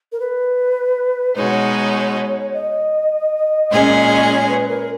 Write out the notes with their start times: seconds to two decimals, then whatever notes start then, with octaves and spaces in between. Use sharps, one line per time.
0.12 A#4
0.20 B4
1.36 B2 G#3 D#4 F#4 C#5
2.53 D#5
3.70 A#2 G#3 C#4 G#4
4.29 D#5
4.33 C#5
4.49 B4
4.68 A#4